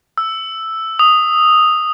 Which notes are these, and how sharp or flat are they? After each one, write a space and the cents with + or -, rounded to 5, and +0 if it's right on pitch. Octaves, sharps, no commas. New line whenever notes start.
E6 +0
D#6 -5